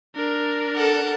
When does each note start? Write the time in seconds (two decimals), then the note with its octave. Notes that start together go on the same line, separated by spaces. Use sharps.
0.15 D4 A#4
0.75 A4 F#5